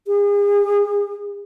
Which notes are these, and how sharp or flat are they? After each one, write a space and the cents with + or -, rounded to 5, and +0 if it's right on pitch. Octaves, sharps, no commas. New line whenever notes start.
G#4 -40